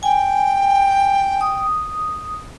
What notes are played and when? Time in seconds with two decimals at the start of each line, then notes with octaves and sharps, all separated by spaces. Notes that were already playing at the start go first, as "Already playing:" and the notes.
0.03 G5 G#5
1.41 D#6